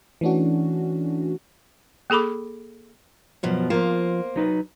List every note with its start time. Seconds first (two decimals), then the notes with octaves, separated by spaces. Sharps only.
0.21 E3 A3 C#4 D4 F#4
2.10 A#3 G#4 A4 B5 D6
3.43 F#2 B2 F3
3.70 F3 A#3 F4 C5
4.36 F#3 D#4 B4